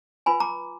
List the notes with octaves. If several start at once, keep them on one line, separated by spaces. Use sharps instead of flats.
F4 B4 G#5 B5
A#5 D6